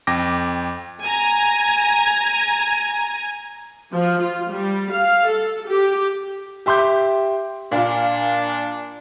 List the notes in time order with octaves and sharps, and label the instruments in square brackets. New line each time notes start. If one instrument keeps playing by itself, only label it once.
[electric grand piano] F2 G5 D6 A#6
[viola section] G#5 A#5
F3
F4
G3
F5
A4
G4
[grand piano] G4 E5 C6 D6 G6
[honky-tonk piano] A#2 F4 [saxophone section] D4